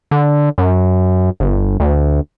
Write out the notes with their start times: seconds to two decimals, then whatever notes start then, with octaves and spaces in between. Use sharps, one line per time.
0.11 D3
0.58 F#2
1.40 G1
1.80 D2